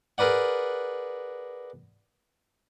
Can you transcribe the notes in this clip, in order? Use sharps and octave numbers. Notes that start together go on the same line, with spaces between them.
G#4 A#4 B4 D5 F#5